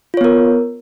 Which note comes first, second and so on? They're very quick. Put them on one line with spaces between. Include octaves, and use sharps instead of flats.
F4 C#5 B3 A#4